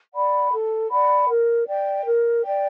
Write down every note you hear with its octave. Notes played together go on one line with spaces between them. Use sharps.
D5 F#5 B5
A4
D5 F#5 B5
A#4
D5 G5
A#4
D5 G5